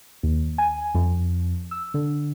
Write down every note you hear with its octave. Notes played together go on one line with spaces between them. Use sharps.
D#2
G#5
F2
E6
D3